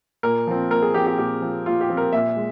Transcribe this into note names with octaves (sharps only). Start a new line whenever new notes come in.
A#2 A#4
F3 C4
A#2 A#4
G#4
F3 C4 G4
G4
A#2 G4
F3 C4
A#2 F4
G4
F3 C4
A#4
A#2 E5
G#3